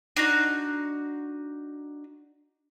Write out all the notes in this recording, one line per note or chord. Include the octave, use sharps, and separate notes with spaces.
D4 D#4 F#4